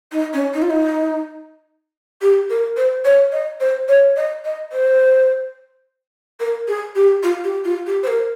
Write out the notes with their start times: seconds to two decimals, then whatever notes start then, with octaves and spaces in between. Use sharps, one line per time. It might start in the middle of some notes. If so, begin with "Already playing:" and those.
0.11 D#4
0.33 C#4
0.53 D#4
0.62 F4
0.70 D#4
2.21 G4
2.49 A#4
2.76 C5
3.05 C#5
3.32 D#5
3.60 C5
3.88 C#5
4.16 D#5
4.44 D#5
4.72 C5
6.40 A#4
6.67 G#4
6.95 G4
7.23 F4
7.44 G4
7.64 F4
7.86 G4
8.03 C5
8.07 A#4